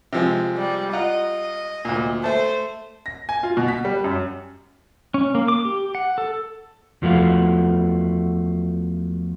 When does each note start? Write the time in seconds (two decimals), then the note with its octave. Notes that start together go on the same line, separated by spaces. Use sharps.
0.13 C3 F3 G#3
0.57 G3
0.93 F4 D#5 F#5 A#5
1.85 D2 A#2
2.24 A3 C5 A5
3.06 A#6
3.29 G#5
3.43 F4
3.57 B2
3.68 B6
3.85 G3
4.04 F#2
5.14 C#4
5.35 A#3
5.48 D6
5.65 G4
5.95 F#5
6.18 A4
7.02 E2 F3 A3 F#4 F5